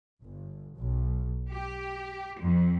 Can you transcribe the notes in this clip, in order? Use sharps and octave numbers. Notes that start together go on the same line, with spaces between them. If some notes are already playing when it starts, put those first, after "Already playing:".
G1
B1
G4
F2